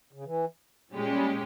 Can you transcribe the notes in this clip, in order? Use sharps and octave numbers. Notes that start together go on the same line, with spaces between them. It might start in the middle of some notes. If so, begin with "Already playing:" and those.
C#3
E3
A#2 G3 G#3 C#4 G4
G3